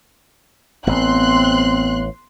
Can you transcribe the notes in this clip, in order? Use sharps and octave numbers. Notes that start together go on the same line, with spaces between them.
A1 B3 C4 C6 F#6